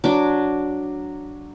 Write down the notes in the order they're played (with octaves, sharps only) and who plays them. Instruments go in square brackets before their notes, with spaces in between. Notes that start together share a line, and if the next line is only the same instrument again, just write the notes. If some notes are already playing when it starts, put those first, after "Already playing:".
[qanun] F#3 D4 D6